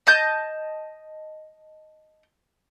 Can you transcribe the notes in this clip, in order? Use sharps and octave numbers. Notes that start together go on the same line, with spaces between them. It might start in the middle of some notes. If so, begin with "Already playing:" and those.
D#5 A5 G6